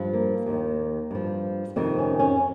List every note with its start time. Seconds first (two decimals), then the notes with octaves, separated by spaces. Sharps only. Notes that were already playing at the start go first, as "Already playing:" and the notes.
Already playing: G2 F3
0.13 A#3
0.46 D#2 D#3
1.11 G2 F3
1.76 F2 C3 D#3 C4
1.98 C#4
2.19 C#4